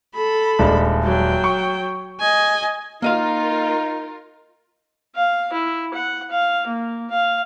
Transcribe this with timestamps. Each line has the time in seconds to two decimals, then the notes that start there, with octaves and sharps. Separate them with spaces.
0.15 A4 B5
0.59 D#1 G#3 D4
1.03 F#3 G5
1.44 C#6
2.20 D#5 G#5
3.02 A#3 D#4 F4 A#4 D#5 F5
5.15 F5
5.52 E4
5.93 F#5
6.31 F5
6.67 A#3
7.10 F5